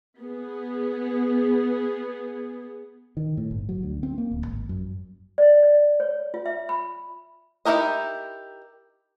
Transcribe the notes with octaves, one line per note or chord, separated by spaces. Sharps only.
B3 G#4
D#3
A2
G1
F#3
D2
C4
A#3
D1
G#1
F#2
D5
D5
C#5
F4
E5
B5
D#4 E4 G4 A#4 D#5